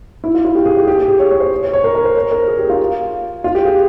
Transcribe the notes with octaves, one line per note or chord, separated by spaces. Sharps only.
E4
F4
F4
G4
G#4
G4
G4
G4
G#4
C#5
C#5
C5
C#5
C#5
A#4
A#4
C5
C#5
A#4
G#4
G4
F4
F4
G4
G#4